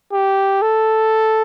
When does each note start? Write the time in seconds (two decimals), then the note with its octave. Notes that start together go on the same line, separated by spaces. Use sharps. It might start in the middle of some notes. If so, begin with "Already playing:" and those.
0.13 G4
0.62 A4